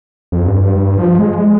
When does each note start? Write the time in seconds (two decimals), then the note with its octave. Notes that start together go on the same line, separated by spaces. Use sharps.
0.32 F2
0.47 G2
0.61 G2
0.76 G2
0.97 F3
1.19 G#3